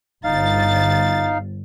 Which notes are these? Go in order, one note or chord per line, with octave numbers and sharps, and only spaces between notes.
G1 D#4 F5 A6